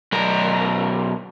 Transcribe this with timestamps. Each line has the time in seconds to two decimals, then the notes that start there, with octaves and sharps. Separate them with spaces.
0.13 B1 A#4